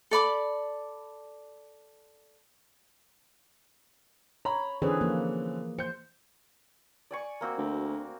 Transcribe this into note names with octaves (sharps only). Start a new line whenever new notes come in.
A4 D5 B5 D6
C#5 A#5 B5
D3 E3 C4 C#4 G#4 B4
F3 A#3
C5 G6 C#7
D5 G#5 C#6
A#3 C4 F#4
D2